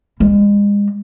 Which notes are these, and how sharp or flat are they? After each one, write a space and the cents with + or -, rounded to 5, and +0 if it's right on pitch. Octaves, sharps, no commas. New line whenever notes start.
G#3 -35